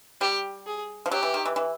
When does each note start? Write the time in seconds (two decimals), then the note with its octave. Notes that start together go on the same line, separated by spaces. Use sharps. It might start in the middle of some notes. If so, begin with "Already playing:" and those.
0.21 G3 G4
0.66 G#4
1.06 F3
1.11 F#3 G4
1.23 E3
1.34 D#3
1.45 E3
1.56 E3